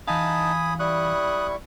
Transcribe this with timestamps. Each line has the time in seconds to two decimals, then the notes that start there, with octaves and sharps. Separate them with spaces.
0.08 E3 D#4 F5 G#5 A5 B5 D#6
0.79 G3 E4 C#6 D#6 F#6